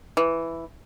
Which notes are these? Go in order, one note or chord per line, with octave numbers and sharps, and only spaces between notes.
E3